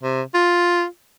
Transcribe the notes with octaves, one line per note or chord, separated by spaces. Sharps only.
C3
F4